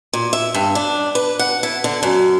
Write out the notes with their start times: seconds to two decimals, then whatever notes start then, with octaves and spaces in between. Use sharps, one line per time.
0.13 A#2
0.33 E5
0.54 G2
0.75 D4
1.15 B4
1.39 F#5
1.63 E4
1.84 D3
2.03 F#2